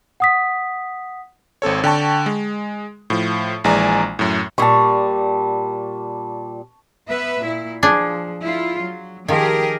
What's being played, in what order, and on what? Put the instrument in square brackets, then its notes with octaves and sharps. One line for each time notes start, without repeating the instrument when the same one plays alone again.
[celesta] F#5 D#6 B6
[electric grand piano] G#1 C4 A4 C#5
D3 G5 A5 C#6
G#3
A2 F3
A#1 E3 G#3 D5 G#5 A#5
F#2 A2
[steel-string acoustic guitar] A#2 G3 [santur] A5 C#6
[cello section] B3 B4 E5
A#2 E4
[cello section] F3 [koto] D4 G#4
[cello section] E4 F4
F#3
[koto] D#3 F3 [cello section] G4 G#4 A#4